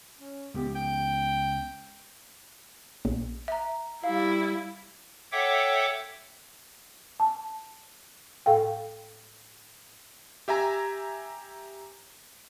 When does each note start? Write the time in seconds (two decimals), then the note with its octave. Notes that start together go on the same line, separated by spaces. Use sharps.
0.19 C#4
0.54 C#2 B3 G4
0.75 G5
3.05 A#1
3.48 E5 A#5
4.04 G3 E4 F5
5.32 A4 C#5 E5 F#5 G5 D6
7.20 A5
8.46 A2 A4 F5 G5
10.48 G4 E5 G#5 A#5